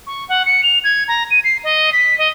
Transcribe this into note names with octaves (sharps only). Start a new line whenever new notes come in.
C#6
F#5
C#7
F7
G#6
A#5
D#7
C7
D#5
B6
D#5